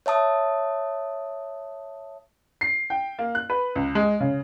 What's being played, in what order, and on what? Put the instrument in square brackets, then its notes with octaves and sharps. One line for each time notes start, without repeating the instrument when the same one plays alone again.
[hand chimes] C#5 E5 A5 D#6
[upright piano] C7
G5
A#3
F#6
B4
C#2
G#3
C#3